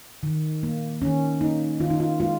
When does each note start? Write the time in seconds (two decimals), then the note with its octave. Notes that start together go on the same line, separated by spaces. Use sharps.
0.23 D#3
0.63 A#3
1.02 D#3 C#4
1.41 A#3 D#4
1.80 D#3 F4
1.90 D#4
2.00 F4
2.20 G#3 F4